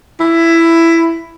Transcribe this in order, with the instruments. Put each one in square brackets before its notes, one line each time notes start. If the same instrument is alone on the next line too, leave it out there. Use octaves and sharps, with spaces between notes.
[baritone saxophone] E4